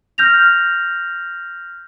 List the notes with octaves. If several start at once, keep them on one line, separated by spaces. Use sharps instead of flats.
F6 G6 A#6 F7